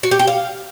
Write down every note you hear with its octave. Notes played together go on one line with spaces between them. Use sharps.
F#4
G4
G5
F5